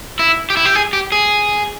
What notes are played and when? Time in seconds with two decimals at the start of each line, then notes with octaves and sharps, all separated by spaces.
0.19 E4
0.50 G4
0.57 E4
0.65 G4
0.75 G#4
0.93 G4
1.12 G#4